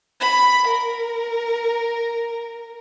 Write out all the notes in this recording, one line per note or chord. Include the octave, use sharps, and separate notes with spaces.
B5
A#4